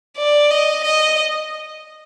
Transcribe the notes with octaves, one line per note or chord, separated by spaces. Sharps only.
D5
D#5
D#5